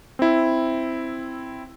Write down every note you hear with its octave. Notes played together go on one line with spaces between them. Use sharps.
C4 E4